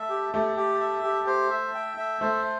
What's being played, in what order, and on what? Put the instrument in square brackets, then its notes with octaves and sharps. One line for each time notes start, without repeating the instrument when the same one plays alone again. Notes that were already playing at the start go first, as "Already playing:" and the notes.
Already playing: [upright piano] A3 [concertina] E5
[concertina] G4
[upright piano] A3 [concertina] G4
[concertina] G4
E5
G4
C5
E5
G5
E5
[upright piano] A3 [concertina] C5